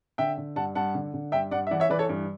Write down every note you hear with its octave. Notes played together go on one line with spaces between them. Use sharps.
D3 E5 G5
D3
G2 F#5 A5
G2 F#5 A5
D3
D3
G2 E5 G5
G2 D5 F#5
E5
E3 D5 F#5
C#5 E5
E3 B4 D5
A4 C#5
G2